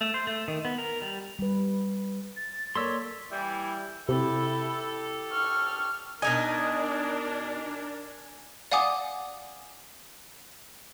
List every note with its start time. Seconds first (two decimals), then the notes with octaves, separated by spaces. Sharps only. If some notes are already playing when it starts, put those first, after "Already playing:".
0.01 A3
0.14 C5
0.27 A3
0.48 D#3
0.65 B3
0.78 A#4
1.02 G3
1.39 G3 B4
2.36 A6
2.75 A#3 A4 C#5 D5 C6 E6 B6
3.30 E3 G3 E4
4.09 C3 E4 G4 A4
5.31 C#6 F6
6.22 B2 D4 D#4 A#4 D#5 G#5 G#6
8.71 D5 F5 F#5 G#5 D6 D#6